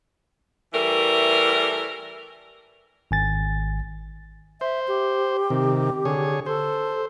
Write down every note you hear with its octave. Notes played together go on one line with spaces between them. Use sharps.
E3 G3 A3 A#4
G#1 G#5 A6
C5 E5
G4
C3 D#3
D3 G#4 C#5
A4 C5